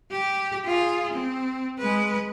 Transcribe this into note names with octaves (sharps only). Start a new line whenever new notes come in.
G4
F4 G#4
C4
G#3 B4